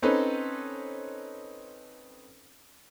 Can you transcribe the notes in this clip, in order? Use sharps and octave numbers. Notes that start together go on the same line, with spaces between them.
C4 C#4 D#4 A4 B4 C5